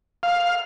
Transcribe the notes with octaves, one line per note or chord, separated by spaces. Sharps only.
F5